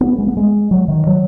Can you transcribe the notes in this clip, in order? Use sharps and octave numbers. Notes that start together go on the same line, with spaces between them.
B3
G#3
B3
G#3
F#3
D#3
F#3